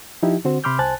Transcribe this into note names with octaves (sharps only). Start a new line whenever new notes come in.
F3 D#4 E4 G4
D3 C4 F#4 C5
C3 B5 C6 D6 F6 G6
C2 C5 G#5 A5 F#6 A6